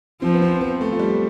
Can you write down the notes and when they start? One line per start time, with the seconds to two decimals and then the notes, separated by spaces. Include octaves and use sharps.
0.22 F3 C4
0.34 B3
0.42 C4
0.61 B3
0.81 A3
0.92 F3
0.99 G3